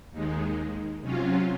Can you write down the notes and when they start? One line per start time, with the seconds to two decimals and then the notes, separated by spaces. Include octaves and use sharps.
0.11 D#2 D#3 G#3
1.02 C3 F#3 C#4 F4